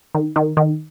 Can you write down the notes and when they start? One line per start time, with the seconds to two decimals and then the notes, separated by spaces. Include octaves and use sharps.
0.15 D#3
0.36 D#3
0.57 D#3